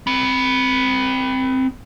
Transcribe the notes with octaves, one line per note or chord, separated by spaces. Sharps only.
C4 B5